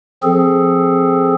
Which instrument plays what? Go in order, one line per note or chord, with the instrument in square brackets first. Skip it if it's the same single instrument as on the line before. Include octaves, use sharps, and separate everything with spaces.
[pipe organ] F3 C4 G#4 A4